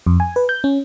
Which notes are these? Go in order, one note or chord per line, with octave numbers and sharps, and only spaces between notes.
F2
G#5
B4
G6
C#4